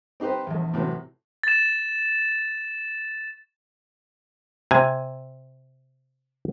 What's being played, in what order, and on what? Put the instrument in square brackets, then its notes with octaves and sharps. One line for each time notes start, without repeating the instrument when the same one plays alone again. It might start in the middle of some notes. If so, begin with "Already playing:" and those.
[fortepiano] C4 D#4 G4 B4 C5
A#1 E2
A2 C3 E3 F#3
[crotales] A6 E7
[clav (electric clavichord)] C3 G#5